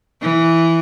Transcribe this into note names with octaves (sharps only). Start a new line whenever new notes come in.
E3